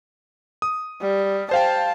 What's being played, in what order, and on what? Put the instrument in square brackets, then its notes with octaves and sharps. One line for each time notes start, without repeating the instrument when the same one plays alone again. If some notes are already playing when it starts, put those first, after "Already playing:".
[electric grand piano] D#6
[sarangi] G3
[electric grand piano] C5 F5 G5 [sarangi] A5